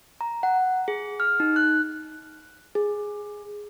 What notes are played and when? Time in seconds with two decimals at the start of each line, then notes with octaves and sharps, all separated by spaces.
0.21 A#5
0.43 F#5
0.88 G#4
1.20 F6
1.40 D#4
1.56 F#6
2.75 G#4